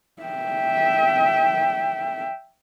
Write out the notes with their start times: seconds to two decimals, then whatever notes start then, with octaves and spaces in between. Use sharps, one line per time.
0.23 E5 G5